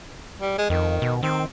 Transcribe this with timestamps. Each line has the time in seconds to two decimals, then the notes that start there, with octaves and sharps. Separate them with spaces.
0.39 G3
0.58 G#3
0.70 F2 D#3
1.02 B2
1.23 D#3 C4